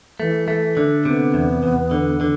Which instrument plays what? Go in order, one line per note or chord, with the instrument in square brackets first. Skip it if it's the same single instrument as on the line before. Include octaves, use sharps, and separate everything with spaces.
[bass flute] E3 [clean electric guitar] A3
[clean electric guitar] A3
D3
[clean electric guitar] C3 [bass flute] B3
[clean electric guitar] E2
E2
D3
D3